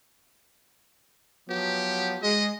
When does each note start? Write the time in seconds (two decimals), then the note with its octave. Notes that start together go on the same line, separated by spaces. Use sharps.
1.49 F3 F#3 B3 G4
2.22 G#3 D#5